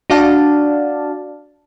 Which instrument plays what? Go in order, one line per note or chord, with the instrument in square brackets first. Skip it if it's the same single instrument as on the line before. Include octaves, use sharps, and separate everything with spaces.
[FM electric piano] D4 F#4 D5 F5 A5